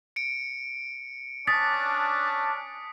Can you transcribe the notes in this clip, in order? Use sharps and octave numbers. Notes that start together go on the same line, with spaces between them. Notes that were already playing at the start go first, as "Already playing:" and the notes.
C#7 D7
C#4 D4 D#6 A6 B6